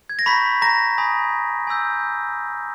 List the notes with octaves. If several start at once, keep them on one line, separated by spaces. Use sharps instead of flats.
G#6
A#6
A#5 B5 C#6 G6 B6
A#5 A#6
G#5 B5 D#6
G#5 B5 E6 G6